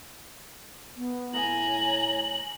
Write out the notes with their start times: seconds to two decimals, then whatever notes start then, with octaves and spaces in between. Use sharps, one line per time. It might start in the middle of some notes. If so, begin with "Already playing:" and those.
0.96 B3
1.33 A2 G#5 A#5 F#7
1.68 C#5